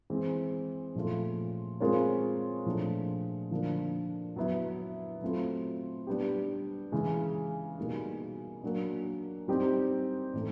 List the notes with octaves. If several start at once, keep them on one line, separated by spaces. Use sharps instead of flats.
E3 G#3 C4
A#2 F3 A3 C#4 F4
G#3 C4 F4 A#4 C#5
A#2 F3 A3 D4
D3 F3 A#3 D4
F#3 B3 E4
F#3 A3 C4 F4
G3 B3 D4 G4
C#3 E3 G#3
B2 G3 A#3 D#4
F#3 A#3 D4
G3 C4 D#4 G4
A2 E3 A3 C#4